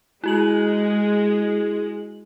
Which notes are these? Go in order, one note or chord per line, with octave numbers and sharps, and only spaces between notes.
G#3 E4 F#4 F#7